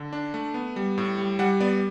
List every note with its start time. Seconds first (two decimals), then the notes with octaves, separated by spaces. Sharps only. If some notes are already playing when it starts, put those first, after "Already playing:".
Already playing: D3
0.13 D4
0.34 A3
0.54 B3
0.76 G3
0.98 A2
1.18 G3
1.39 G3 F#5
1.60 B3 D5